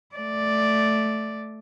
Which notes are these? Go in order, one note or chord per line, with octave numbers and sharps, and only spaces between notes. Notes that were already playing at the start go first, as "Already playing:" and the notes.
A3 D5